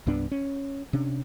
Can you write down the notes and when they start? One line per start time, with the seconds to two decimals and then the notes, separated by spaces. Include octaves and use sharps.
0.06 C2 G2 B3 D4
0.31 C#4
0.93 C3 C#4 D4